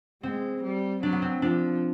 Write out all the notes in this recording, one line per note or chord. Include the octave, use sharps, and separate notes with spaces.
G#3 C4
G3
F#3 D4
B3
C4
F3 D4